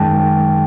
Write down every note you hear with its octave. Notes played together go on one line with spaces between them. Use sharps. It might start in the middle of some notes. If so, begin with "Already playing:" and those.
Already playing: F#2 D#3 G#3 G5 A5